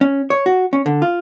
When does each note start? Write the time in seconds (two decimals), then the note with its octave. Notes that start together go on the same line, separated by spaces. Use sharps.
0.01 C#4
0.30 C#5
0.46 F#4
0.73 C#4
0.86 D3
1.02 F4